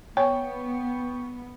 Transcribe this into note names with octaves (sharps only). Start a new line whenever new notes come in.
B3 C#5 G5 G#5 C#6